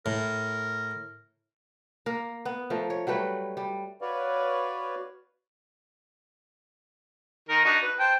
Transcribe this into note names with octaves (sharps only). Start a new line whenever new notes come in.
A2 A#4
A#3 A#4
B3
F3 A3 A#4
C#5
F#3 G3 A3 B4
G3
F#4 B4 C#5 D5 F5
D#3 D#4 A#4
D4 D#4 F#4
B4
C5 G5 A5